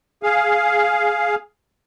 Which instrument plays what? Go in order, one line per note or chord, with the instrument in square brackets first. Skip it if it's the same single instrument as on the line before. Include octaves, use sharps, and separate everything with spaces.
[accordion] G#4 F5